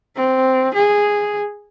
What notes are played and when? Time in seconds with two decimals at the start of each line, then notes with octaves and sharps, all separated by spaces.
0.16 C4
0.74 G#4